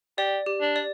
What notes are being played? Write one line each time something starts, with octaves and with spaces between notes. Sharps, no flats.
G4 D5
G4
D4
D5